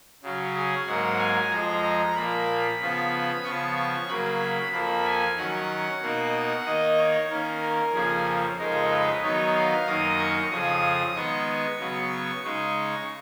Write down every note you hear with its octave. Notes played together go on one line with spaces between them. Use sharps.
C#3 F#3 C#4
G#4
G#2 F#3 A#3 F#5
G#5
F2 F3 G#3 A#5
A#5
A#2 F3 A#3 B5
C#3 F3 B3
C#3 F3 B3 C#6
C#6
C#3 F#3 A#3 B5
F2 F3 A#3 B5
G#5
D#3 F#3 C#4 F#5
B2 A#3 D#4
D#3 A#3 D#4 D#5
C#5
D#3 A#3 C#4 A#4
A#4
F2 C#3 F3 A#3 C#4 G#4
F2 C#3 G#3 D#4 A#4
B4
D#3 F#3 B3 D#4 C#5
F5
F#2 D#3 A#3 D#4 D#6
C#6
F2 C#3 F3 D#6
D#3 G#3 B3 C#6
C#3 F#3 B3
C#3 G#3 D#4 C#6